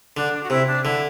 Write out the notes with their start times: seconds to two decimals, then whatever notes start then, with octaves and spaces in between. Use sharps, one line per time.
0.16 D3 D4
0.43 F#4
0.50 C3 E4
0.67 D4
0.84 D3 E4